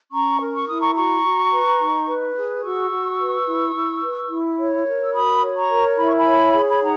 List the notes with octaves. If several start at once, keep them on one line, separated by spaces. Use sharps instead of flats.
C#4 A#5 C#6
A#4
C#6
E4 D#6
A#5 C#6
F#4 A#5 C#6
F#4
B4
D#4
B4
G#4
F#4 C#6 E6
F#4
B4
E4
E4
B4
E4
C#5
A#4
E6
F#4 B5 D#6
C#5
A#5 C#6
A#4
E4 B5
C#6
G#5 B5
C#5
G#4
B5
D#4 F#5 A#5